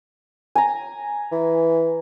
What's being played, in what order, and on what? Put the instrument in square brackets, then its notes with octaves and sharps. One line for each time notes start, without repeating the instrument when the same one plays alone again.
[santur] G#5 A#5
[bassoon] E3